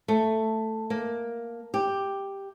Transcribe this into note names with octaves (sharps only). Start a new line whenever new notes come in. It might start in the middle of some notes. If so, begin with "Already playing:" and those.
A3
A#3
G4